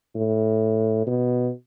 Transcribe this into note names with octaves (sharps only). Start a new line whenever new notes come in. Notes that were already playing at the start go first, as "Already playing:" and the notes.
A2
B2